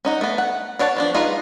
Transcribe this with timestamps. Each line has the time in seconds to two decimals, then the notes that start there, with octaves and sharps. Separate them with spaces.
0.05 C#4 D#4 F#5
0.21 A3 B3
0.38 F#5
0.79 D4 C#5 F#5 G#5 A5
0.97 F3 B3 D4
1.15 D#4 F4 G#4 B4